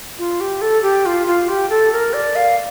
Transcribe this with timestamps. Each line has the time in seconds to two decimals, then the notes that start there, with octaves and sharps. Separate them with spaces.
0.19 F4
0.41 G4
0.62 A4
0.83 G4
1.06 F4
1.27 F4
1.49 G4
1.70 A4
1.92 A#4
2.14 D5
2.36 F5